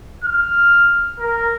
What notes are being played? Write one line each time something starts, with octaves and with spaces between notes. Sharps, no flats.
F6
A#4